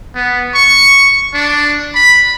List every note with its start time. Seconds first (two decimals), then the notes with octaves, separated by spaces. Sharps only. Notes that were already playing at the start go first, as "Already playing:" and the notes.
0.15 B3
0.54 C#6
1.34 D4
1.95 B5